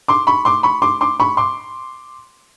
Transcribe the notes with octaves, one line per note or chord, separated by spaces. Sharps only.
C6 D6
B5 C#6
C6 D6
B5 C#6
C6 D6
C6 D6
B5 C#6
C6 D6